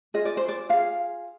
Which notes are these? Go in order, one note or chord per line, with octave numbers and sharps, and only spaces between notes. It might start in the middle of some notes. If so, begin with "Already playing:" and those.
F4 G#4 D#5
D5
C5
D5
F4 G#4 F5